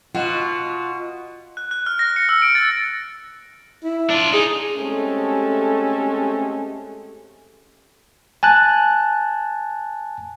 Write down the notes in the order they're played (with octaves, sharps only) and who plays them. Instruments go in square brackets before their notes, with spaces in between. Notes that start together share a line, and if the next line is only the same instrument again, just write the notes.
[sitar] B2 F#4 [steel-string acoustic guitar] F4
[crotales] F#6
F#6
F6
A#6
C#7
E6
D7
A6
[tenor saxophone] E4
[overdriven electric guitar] D4 F4
[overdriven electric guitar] D#4 [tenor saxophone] G#4
[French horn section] G#3 A3 C4 C#4 G4 A4
[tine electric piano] G#5 A5 F#6